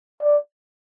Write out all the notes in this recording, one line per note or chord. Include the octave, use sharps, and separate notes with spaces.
D5